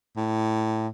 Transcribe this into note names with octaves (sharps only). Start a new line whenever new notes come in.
A2